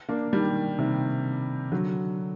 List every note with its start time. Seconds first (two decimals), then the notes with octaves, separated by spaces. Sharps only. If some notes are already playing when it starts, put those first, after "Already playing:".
0.09 A#3 D4
0.33 D#3 G3
0.78 C3 D#3
1.72 D3 F#3